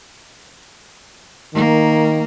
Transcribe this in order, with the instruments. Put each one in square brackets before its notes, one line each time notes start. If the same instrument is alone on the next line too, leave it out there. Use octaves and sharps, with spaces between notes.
[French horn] D#3 [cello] A#3